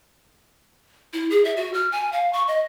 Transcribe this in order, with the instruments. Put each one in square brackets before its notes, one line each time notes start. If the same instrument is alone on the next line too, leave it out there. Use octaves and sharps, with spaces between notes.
[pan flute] E4
G#4
E5
F#4
F6
G#5
F5
C#6
D#5